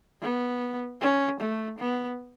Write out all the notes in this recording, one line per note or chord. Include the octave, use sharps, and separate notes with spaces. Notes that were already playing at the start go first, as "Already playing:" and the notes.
B3
C#4
A3
B3